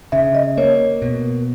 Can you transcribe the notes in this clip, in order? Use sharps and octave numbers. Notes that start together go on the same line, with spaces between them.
C#3 E5
D#5
A#3 C#5
B2